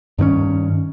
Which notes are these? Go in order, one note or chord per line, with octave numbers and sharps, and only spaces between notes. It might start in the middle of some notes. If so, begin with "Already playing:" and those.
G2 D#3 C4 C#4